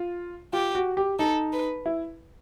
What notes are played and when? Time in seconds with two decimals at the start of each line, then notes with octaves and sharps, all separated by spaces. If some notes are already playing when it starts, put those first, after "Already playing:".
Already playing: F4
0.53 F4 G4
0.75 F#4
0.97 G4
1.19 D#4 A4
1.53 B4
1.86 E4